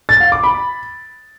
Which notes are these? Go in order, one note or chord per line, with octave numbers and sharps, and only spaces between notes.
A6
F5
D6
B5